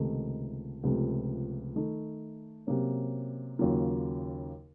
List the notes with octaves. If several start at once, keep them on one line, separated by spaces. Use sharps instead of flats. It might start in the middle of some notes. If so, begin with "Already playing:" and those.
Already playing: C#2 C3 D#3 A3 D#4
C#2 C3 F3 A3
D#3 A3 D#4
C3 F#3 A#3 C#4
D#2 C#3 F#3 A#3 F4